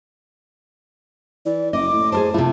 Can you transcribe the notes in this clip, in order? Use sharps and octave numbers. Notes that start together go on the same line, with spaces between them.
E3 D5
F#1 D#5 D6
A2
G#4 A#4 C5 A5
C3 F3 A3 E4